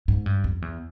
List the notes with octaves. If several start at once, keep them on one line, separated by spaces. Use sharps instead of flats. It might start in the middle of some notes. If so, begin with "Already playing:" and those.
G#2
G2
F2
E2